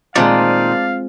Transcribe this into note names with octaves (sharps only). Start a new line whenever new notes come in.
A#2 D#3 G#3 C4 F4 D5 F5 A5